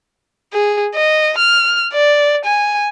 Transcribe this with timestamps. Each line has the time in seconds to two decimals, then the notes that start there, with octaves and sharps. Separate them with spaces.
0.53 G#4
0.95 D#5
1.38 F6
1.94 D5
2.45 G#5